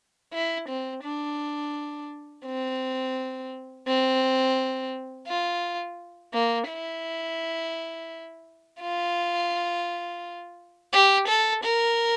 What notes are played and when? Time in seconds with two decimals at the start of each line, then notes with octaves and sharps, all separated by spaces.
0.33 E4
0.69 C4
1.04 D4
2.45 C4
3.87 C4
5.28 F4
6.33 A#3
6.69 E4
8.81 F4
10.93 G4
11.28 A4
11.64 A#4